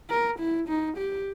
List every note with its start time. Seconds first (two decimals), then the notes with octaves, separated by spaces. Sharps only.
0.10 A#4
0.39 E4
0.68 D#4
0.97 G4